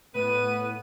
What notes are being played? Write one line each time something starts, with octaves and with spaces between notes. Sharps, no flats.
A2 B3 B4 D#7